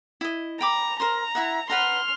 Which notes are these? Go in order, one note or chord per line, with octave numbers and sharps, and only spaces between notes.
E4 D#5
G5 A#5 B5 D6
A#4 C5 A#5 C6
E4 E5 F#5
B4 F#5 A#5 C6 F6